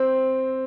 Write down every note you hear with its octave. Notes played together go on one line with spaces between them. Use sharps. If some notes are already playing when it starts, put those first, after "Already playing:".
Already playing: C4